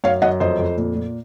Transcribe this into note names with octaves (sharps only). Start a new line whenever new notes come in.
F#2 C#5 F5
F#2 D#5 F#5
F2 C5 D#5
F2
A#2
A#2